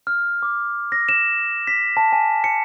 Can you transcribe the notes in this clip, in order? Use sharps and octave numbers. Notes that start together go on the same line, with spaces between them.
F6
D6
A#6
E7
B6
A5
G#5
C#7